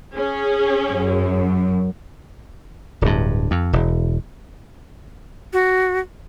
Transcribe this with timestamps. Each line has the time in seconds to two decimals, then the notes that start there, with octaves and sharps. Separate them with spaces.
0.13 C#4 G#4
0.88 F#2
3.01 D1 G2
3.51 F2
3.73 E1
5.53 F#4